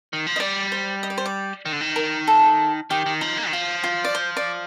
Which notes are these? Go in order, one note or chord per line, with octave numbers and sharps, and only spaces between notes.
D#3
F3
D#5
G3 D5
C5
D#5
D5
C5
D5
D#3
D3
D#3
A#4
A4
D#3 G4
D#3
F3 D#4
A#3
D#3
F3 F4
F4
D5
C5
D5